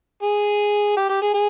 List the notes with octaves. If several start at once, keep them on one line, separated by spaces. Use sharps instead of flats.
G#4
G4
G4
G#4
G#4